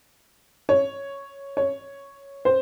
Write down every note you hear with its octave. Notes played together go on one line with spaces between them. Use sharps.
C#5
C#5
C5